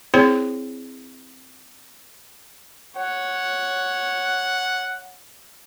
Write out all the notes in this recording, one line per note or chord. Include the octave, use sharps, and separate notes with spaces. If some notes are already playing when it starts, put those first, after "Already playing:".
C4 E4 G#4 C5 C#5
C#5 F#5